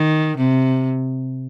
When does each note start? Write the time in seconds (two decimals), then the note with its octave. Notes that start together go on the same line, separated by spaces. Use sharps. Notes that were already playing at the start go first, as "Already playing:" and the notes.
Already playing: D#3
0.38 C3